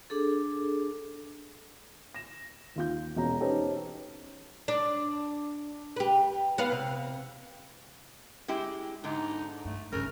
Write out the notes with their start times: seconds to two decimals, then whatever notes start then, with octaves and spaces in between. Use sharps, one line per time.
0.10 D4 G#4 A4
2.14 A#6 E7
2.76 D#2 F4 G6
3.16 E1 B2 C#4 A#5
3.40 C#4 D#4 G4 A4 B4 C5
4.68 D4
5.96 G4 B4
6.58 B3 B4 F5
6.72 C3
8.48 G#3 E4 G4
9.04 G#2 D3 D#4
9.65 G2 A3
9.93 G1 G#2 C#3 A#4